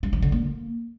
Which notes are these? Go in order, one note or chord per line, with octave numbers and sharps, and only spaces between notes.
G3
F3
D3
A#3